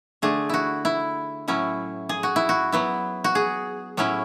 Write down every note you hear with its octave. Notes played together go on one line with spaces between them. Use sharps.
D3 A3 D4 G#4
E4 F#4
E4
A2 F#3 C#4 E4
G#4
F#4
E4
F#4
F#3 B3 E4
F#4
G#4
A2 F#3 C#4 E4